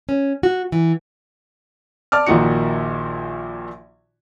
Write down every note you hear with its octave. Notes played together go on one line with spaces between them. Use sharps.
C#4
F#4
E3
D5 A5 D6 F6
A#1 A#2 D#3 D#4 F#4 C#7